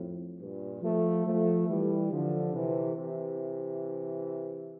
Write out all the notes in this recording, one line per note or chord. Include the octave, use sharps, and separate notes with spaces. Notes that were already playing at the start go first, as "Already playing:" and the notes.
Already playing: F2 A2
G2 A#2
F3 A3
F3 A3
E3 G3
D3 F3
C3 E3
C3 E3